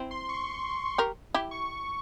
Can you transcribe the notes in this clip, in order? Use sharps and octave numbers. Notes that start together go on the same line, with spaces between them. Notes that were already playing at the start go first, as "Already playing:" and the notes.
Already playing: C4 E4
C6
C#6
G4 A#4
E4 G4
C#6